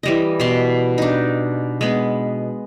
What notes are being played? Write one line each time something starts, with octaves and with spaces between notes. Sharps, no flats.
E3 G3 D#5
B2 C6
D4 D#4
G#3 B3